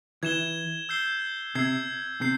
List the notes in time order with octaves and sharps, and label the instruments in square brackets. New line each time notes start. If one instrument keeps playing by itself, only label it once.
[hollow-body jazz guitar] E3 [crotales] G#6 E7 G7
[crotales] E6 G6 C7 G7
[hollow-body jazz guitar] C3 [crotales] E6 G#6 C7
[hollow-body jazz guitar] C3 [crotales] G6 C7